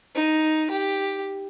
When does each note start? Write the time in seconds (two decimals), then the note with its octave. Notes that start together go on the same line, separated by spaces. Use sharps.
0.15 D#4
0.71 G4